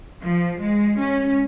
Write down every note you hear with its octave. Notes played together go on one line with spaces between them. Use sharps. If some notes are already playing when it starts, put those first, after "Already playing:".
F3
G#3
C#4